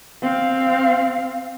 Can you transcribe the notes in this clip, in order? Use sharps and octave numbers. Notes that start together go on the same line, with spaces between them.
C4 F5